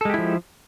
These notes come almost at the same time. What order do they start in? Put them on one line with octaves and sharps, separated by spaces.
A4 G#3 G4 E4 F3